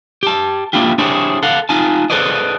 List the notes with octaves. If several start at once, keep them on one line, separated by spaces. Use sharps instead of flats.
G4 A5
A#3 D4 E4 F4 G4
D4 E4 G4 G#4 C5 C#5
A4 F5 F#5
D#4 F4 G#5 A5
G#4 A4 B4 C5 D5 D#5